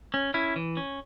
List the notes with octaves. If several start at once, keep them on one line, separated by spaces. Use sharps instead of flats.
C#4
C#4 E4
E3
C#4